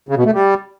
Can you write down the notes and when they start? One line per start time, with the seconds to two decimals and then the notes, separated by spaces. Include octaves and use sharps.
0.09 C#3
0.17 B2
0.25 A3
0.33 G3